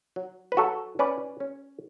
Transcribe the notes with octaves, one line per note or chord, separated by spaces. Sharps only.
F#3
B4
F#3 F#4 A4
C#4 B4 D5
C#4